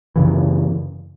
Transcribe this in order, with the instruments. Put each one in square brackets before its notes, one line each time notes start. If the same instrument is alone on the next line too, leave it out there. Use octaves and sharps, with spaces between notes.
[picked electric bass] F#2 C#3 E3